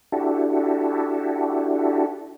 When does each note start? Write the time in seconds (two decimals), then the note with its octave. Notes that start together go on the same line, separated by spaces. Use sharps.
0.12 D4 E4 F#4 G4 A4